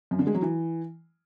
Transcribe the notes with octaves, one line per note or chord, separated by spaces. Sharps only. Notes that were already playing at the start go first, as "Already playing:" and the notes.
F#2
D3
G#3
F#3
E3